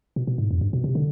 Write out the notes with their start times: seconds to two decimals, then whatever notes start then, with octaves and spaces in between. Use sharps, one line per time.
0.16 B2
0.27 B2
0.38 G#2
0.51 F2
0.61 G2
0.73 B2
0.84 C3
0.95 D3